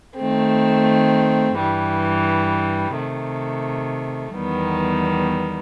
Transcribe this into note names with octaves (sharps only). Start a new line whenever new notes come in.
D#3 A3 C4
G2 E3 G3
C3 D#3 A3
E2 D#3 G3 B3